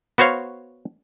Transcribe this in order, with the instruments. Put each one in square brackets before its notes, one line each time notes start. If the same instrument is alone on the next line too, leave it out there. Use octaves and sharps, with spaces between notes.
[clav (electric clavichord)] B3 F#4 C5 C#5 F5